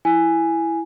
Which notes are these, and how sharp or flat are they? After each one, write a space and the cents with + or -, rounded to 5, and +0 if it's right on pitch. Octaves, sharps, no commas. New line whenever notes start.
E4 +5 G#5 +0